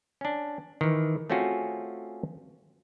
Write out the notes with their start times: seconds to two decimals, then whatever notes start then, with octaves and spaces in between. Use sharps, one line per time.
0.21 C#4 D4
0.81 D#3 E3
1.30 A3 C4 C#4 F4 F#4 G#4